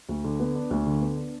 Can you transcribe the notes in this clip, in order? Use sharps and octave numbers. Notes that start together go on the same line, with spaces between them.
D2
D3
B3
D4
D2
D3
B3
D4